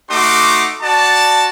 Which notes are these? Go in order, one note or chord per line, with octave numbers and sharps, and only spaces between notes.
A3 D#4 F#4 C6 D6
F#4 D5 A5